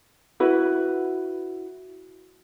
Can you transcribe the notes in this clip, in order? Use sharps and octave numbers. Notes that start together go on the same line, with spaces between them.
E4 F#4 B4